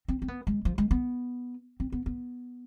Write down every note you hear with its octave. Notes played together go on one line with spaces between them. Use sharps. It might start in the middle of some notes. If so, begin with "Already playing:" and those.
C4
C4
B3
G#3
F3
G#3
B3
C4
B3
B3